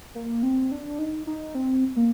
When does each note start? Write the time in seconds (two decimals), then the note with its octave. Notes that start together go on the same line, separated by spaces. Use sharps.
0.15 A#3
0.43 C4
0.72 D4
0.99 D#4
1.27 D#4
1.55 C4
1.96 A#3